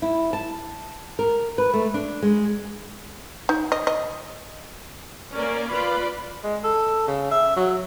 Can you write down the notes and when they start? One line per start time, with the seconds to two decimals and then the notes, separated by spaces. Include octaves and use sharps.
0.02 E4
0.33 A5
1.19 A#4
1.58 B4
1.74 A3
1.94 D4
2.22 G#3
3.49 D#4
3.72 D#5
3.87 D#5
5.33 A#3 C#4 A#4 D5
5.72 F4 B4 D5 B5
6.44 G#3
6.64 A4
7.08 C#3
7.31 E5
7.57 F#3